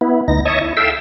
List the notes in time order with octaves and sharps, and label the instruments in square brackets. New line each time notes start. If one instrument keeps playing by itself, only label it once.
[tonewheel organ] B3 E4
D2 D#4 A#6
C#5 D#5 E5 A5 C#6 D#6
E4
A4 E5 F5 G5 E6